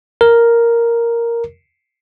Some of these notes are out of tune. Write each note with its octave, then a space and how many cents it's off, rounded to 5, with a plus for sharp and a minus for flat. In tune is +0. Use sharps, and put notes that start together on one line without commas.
A#4 +0